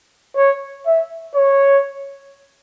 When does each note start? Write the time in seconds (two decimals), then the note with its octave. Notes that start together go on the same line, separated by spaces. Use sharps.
0.36 C#5
0.86 E5
1.35 C#5